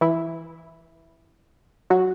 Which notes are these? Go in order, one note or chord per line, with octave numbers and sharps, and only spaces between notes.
E3 E4
F#3 F#4